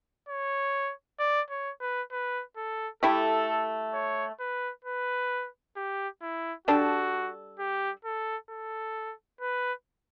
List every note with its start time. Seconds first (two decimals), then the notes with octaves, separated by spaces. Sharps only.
0.29 C#5
1.19 D5
1.50 C#5
1.81 B4
2.12 B4
2.57 A4
3.03 A3 E4 G4 A4
3.94 C#5
4.40 B4
4.85 B4
5.76 G4
6.22 E4
6.68 G3 D4 F#4 A4
7.59 G4
8.05 A4
8.50 A4
9.41 B4